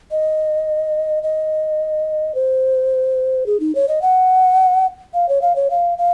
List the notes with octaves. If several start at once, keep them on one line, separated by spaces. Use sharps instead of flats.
D#5
D#5
C5
G#4
D#4
C#5
D#5
F#5
F5
C#5
F5
C#5
F5
F5